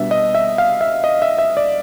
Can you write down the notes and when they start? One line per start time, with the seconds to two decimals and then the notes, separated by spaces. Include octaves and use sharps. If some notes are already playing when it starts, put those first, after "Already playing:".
Already playing: B2 G3 B3 D4 E5
0.11 D#5
0.35 E5
0.58 F5
0.81 E5
1.04 D#5
1.22 E5
1.38 E5
1.57 D5